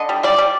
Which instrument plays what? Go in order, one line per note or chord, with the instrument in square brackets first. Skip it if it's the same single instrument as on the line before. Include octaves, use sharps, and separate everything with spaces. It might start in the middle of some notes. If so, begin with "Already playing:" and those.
Already playing: [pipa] D3 D#5
G3
G3 D5
G3